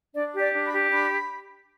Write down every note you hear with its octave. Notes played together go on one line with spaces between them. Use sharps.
D4 D5
G4
D5
D4
B5
G4
D4 B5